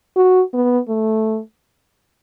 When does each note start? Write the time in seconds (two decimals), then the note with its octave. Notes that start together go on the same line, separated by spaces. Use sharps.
0.16 F#4
0.53 B3
0.88 A3